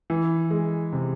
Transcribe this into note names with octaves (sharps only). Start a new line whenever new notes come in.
E3
G#3
C3